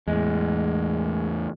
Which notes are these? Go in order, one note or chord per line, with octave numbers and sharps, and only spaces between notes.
E2 A2 G#3